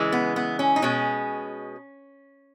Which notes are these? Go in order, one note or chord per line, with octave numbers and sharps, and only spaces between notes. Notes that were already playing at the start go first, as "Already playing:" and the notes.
Already playing: C#3 E3 G#3
B3
B3
C#4
D#4
B2 G#3 C#4